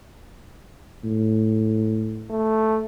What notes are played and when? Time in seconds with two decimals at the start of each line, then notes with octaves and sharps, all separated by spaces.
1.04 A2
2.30 A3